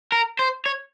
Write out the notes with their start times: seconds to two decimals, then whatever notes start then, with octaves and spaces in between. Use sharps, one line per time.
0.12 A#4
0.39 C5
0.66 C#5